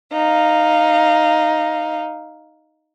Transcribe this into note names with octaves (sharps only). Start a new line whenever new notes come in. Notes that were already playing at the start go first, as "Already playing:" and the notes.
D#4 F5